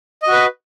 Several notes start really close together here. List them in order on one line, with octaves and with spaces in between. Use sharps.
D#5 F#4 B4